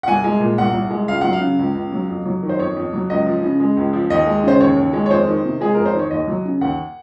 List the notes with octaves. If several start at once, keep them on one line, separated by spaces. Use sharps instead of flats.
F#5
C2 G#5
G#3
A#2
C2 F#5
C2
G#3
C#2 F5
F#3 F#5
F5
C#3
C#2
C#2
F#3
F2
F#3
D#3
C5
F2 C#5
F2
F#3
C#2 D#5
F3
C#3
G#3
C#2
F3
D#2 D#5
G#3
C#3 C5
D#2 C#5
D#2
G#3
C#5
F2 C5
D#3
C3
G#3 G#4
F2 A#4
C5
D#3
C#5
D#2 D#5
F#3
C#3
D#2 F#5